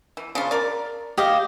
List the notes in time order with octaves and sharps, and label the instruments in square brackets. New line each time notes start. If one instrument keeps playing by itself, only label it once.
[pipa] E3
C#3 D4 F4
A#4 D5
[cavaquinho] G4 D#5 F5